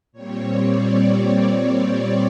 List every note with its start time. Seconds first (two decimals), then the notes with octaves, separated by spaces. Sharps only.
0.12 A#2 G3 C4 C#5
0.58 D5
1.91 D5